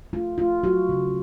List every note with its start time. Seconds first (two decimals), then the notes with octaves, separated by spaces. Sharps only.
0.13 A3 F4
0.38 A3 F4
0.63 F#3 F#4
0.89 C#3